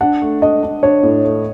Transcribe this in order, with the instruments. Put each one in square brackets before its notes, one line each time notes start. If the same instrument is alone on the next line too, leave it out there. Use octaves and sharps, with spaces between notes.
[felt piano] D4 [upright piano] F#5
[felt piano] A3
[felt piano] D4 [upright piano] D#5
[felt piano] D4
[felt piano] D4 [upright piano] C#5
[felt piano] A2
A3